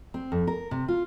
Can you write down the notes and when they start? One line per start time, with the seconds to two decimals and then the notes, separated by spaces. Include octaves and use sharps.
0.14 C4
0.32 F2
0.47 A#4
0.71 C3
0.88 F4